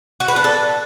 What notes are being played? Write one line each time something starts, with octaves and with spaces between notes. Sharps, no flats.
F#4
B4
D4
A4